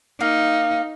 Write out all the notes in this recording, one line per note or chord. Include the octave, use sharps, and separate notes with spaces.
A#3 D#4